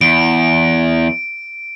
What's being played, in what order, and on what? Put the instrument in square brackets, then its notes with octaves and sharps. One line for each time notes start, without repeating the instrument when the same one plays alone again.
[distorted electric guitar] E2 [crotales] D7